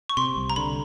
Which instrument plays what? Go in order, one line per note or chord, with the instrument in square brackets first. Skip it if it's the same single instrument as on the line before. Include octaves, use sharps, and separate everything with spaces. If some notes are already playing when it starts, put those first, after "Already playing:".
[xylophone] C#6
[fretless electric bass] C3 [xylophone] C6
[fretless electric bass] C2
[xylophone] A#5
[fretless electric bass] D3 [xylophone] B5